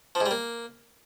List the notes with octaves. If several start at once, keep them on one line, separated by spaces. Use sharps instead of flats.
F3
G#2
G3
A#3